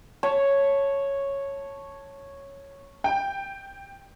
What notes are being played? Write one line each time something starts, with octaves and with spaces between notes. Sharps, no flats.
C#5 A5
G5